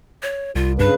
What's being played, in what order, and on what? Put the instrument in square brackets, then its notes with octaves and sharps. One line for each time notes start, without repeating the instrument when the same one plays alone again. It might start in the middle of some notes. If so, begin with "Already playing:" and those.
[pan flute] C#5
[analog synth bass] C2 [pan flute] F4
[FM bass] G2 [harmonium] C#3 B4 [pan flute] D4